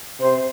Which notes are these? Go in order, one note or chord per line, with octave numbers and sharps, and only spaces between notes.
C3 C5